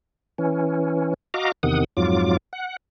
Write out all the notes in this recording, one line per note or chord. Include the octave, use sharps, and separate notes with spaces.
E3 C#4
F#4 D#5 F5 A#5 D6
E2 C3 D#3 F#5 D#6
F2 G#2 F#3 F4 D6
F#5